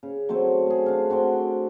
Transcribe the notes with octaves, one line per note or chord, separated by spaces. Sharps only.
C#3
F#3 A3 C4 C5
A3 G#4
D4 F5
C4 F#4 D5 C6